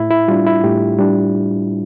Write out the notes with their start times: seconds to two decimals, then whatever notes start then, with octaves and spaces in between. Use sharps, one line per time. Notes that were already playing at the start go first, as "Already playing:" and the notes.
Already playing: A2 E4
0.11 E4
0.28 G3 D4 F4
0.46 E4
0.64 A2 G4
0.98 G3 D4